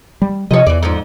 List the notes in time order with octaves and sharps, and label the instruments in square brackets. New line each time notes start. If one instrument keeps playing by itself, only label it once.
[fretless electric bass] G3
[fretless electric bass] C3 F3 [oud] C#5 D#5
[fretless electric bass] E2 [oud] E3 D5
[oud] F2 G#2 F3